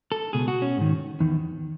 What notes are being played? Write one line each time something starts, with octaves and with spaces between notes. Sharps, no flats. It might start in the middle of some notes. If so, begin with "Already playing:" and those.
A4
C#2 B2 G#4
F#4
C#4
G#2 D#3
E2 D#3